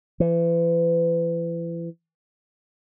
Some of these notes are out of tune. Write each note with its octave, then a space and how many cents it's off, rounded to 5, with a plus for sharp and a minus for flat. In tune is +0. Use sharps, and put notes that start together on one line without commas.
E3 +35